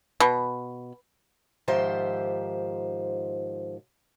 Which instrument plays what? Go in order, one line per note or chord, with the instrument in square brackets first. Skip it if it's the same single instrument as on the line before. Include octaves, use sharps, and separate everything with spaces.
[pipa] B2
[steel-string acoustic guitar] G#2 D#3 F3 G4 C5 E5